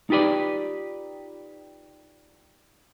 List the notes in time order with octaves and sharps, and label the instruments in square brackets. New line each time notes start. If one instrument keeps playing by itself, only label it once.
[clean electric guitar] D#4 F4 G4 B4 D5